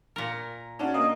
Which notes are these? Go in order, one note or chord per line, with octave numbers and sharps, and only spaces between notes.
A#2 A#4
C#4 D4 F#4
A#3 D#5